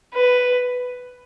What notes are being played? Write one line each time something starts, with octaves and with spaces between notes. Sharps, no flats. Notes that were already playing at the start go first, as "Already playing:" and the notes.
B4